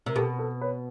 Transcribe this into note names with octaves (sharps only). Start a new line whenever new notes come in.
C3 A#4
B2 G4 A4
A4 B4
B4 C#5